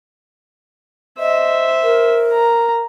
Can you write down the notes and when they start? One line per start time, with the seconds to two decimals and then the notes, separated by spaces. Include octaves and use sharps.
1.19 C5 D#5 E5
1.83 A#4
2.33 A#5